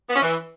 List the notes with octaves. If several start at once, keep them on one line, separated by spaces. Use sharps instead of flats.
B3
C#4
E3